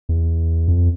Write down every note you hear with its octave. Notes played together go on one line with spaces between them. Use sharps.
E2
F2